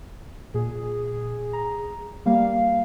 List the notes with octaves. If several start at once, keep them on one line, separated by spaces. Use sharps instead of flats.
A#2 G#4
A#5
G3 A#3 F5